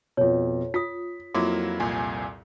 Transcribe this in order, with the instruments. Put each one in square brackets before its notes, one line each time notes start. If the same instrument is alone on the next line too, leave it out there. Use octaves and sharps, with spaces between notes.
[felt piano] F2 B2 [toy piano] C#5
[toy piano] F4 D#6 [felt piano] B6
[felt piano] F2 [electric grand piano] F#3 A#3 E4 [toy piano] A#4 C6 D6
[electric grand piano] C2 A#2 G#5